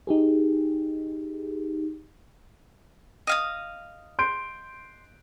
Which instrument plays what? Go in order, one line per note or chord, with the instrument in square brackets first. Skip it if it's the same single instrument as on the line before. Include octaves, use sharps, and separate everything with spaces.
[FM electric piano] D#4 G4 G#4
[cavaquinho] D#5 F5 D#6
[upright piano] C6 G6 D7